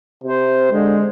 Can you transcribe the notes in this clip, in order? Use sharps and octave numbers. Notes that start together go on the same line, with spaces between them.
C3 C5
D3 G#3